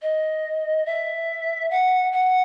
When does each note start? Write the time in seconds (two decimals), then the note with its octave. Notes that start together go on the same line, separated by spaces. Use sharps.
0.02 D#5
0.85 E5
1.70 F#5
2.12 F#5